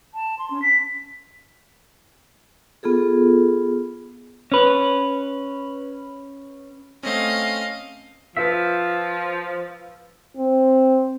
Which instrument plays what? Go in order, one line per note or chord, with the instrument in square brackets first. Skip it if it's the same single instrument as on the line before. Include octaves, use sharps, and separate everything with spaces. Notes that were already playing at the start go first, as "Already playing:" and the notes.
[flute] A5
C6
C#4
B6
[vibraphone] B3 F4 G#4 A4
[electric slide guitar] C#4 B4
[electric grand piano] A3 C4 C#4 [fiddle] D#5 F5
[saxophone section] F3 [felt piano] B4 F5 [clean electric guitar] E5
[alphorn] C4